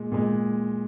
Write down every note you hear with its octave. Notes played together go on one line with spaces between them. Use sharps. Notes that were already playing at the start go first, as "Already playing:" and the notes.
Already playing: A#2 G#3
A#2 G#3